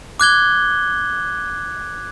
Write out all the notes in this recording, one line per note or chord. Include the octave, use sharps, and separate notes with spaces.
D6 F#6 G#6 G7